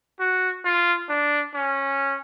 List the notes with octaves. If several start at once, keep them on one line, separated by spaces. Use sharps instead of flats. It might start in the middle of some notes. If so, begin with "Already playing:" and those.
F#4
F4
D4
C#4